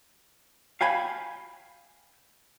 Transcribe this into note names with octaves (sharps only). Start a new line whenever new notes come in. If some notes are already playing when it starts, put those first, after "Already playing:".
F5 G5 G#5 B5